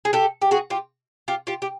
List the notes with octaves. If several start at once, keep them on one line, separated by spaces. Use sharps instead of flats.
G#4
G4 A4
G4
F#4 G#4
F4 G4
F4 G4
F4 G4
G4